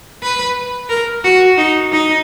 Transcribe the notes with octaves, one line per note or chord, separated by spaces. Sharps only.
B4
A#4
F#4
D#4
D#4